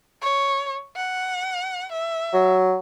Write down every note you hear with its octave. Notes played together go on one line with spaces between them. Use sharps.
C#5
F#5
E5
F#3